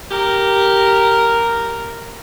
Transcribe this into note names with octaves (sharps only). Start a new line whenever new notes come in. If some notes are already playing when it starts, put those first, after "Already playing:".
G4 A#4